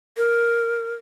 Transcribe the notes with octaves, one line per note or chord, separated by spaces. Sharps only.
A#4